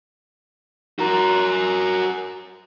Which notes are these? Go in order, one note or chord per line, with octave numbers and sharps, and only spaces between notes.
F#4 A#4